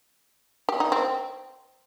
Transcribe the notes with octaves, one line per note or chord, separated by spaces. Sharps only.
G4
D#4
C4